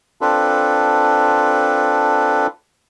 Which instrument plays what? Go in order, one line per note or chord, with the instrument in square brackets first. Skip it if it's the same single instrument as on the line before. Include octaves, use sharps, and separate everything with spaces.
[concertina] C4 D4 F4 A4 B4